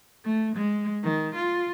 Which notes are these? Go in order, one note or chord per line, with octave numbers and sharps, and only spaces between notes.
A3
G#3
D#3
F4